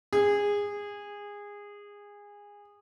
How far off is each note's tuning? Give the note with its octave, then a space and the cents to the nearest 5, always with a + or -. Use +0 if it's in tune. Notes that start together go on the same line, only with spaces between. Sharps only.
G#4 -20